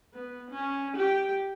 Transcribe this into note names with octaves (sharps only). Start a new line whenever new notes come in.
B3
C#4
G4 G5